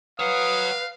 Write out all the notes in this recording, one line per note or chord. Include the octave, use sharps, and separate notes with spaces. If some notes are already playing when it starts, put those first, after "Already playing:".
B4 C#5 F5 F#5 D#6